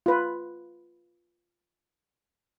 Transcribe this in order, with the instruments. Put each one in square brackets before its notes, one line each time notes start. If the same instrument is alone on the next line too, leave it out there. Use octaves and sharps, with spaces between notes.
[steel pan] F4 B4